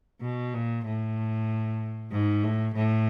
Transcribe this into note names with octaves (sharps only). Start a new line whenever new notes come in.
B2
A#2
A2
G#2
A2
A2